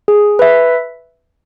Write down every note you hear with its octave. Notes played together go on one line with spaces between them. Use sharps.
G#4
B4 E5